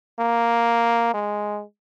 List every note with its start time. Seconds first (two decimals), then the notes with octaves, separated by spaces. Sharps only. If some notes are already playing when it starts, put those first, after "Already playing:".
0.19 A#3
1.14 G#3